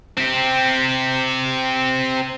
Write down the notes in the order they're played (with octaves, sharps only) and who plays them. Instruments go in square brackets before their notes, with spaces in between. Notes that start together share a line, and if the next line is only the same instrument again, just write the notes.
[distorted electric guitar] C4 G4